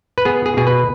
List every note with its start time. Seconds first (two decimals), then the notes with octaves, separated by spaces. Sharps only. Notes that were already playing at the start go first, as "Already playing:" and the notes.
0.18 B4
0.25 B3 G#4
0.46 G#4
0.57 B2 G#4
0.67 B4